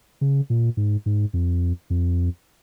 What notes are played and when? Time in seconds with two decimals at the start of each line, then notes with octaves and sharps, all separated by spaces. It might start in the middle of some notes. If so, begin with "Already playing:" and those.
0.21 C#3
0.50 A#2
0.77 G#2
1.06 G#2
1.33 F2
1.90 F2